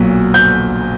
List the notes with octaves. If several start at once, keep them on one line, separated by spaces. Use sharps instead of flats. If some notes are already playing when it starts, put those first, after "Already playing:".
Already playing: B1 A#2 F#3
G6